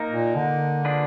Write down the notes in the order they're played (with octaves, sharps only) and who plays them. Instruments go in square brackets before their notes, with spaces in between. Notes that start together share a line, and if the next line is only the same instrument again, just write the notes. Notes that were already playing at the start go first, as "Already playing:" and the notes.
Already playing: [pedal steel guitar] A#3 D#4 A#4
[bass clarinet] A#2
D3
[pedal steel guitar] A#3 D4 F4 G#4 B4